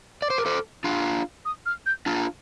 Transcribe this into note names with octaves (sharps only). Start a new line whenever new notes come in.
D5 D6
C5
A#4
A4 C5
D4 F4
D#6
F6
G6
D4 F4